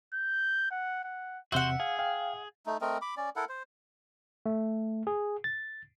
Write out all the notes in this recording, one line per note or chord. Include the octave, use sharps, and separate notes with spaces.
G6
F#5
F#5
E2 C3 F#4 C5 E5 F#5
G#4 F5
F5 G5
A3 D#4
A3 C4 A#4 D#5
B5 D6
C#4 D5
E4 A4 A#4 F#5
C5
A3
G#4
A6